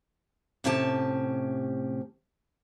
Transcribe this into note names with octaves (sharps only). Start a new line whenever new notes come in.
A2 C3 C#4 G4 A5